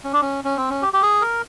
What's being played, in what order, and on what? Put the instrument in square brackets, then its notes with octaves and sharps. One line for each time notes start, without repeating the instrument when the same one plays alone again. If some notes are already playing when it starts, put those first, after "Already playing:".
[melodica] C#4
D4
C#4
C#4
C4
C#4
G4
G4
G#4
A#4